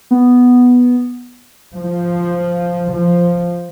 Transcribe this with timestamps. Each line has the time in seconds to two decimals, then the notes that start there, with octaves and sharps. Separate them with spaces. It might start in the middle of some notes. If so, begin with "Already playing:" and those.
0.11 B3
1.76 F3
2.92 F3